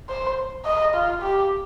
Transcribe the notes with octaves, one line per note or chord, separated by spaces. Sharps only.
C5
D#5
F4
G4